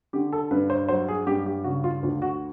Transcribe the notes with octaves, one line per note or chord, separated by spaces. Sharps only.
D3 G4
A4
G2 B4
C5
F#3 C5
G#4
G2 G4
G4
C#3 F#4
F4
D2 F4
F#4